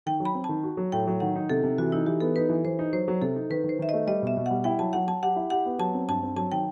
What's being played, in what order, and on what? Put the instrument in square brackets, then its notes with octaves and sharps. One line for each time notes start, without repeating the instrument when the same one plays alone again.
[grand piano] D#3 [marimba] G5
[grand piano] F#3
[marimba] B5
[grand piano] C4
[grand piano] D#3 [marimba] A5
[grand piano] F#4
F#3
[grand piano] A2 [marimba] G5
[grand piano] F#3
[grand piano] D#3 [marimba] F#5
[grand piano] D#4
[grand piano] C3 [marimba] A4
[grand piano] C3
[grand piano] E3 [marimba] F#4
[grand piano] D#4 [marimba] E4
[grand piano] E3 [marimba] G4
[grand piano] B3 [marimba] A4
[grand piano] D#4 [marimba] B4
[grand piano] E3
[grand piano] E3 [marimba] C5
[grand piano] D#4
[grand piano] F#3 [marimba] C5
[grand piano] F#3
[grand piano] C3 [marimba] A4
[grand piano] D#4
[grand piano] D#3 [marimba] B4
[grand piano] D#3
[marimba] C5
[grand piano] D#3 [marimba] E5
[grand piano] A3 [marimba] D#5
[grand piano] G3 [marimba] D#5
[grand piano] B2 [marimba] E5
[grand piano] B2
[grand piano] G3 [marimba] F#5
[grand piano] E4 [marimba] G5
[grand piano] F#3 [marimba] A5
[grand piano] F#3 [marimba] F#5
[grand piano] F#3 [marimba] A5
[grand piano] G4 [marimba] F#5
[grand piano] E4
[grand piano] G4 [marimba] F#5
[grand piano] B3
[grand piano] F#3 [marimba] A5
[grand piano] C4
[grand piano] G2 [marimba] A5
[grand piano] C4
[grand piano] F#3 [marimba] A5
[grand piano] D#3 [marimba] G5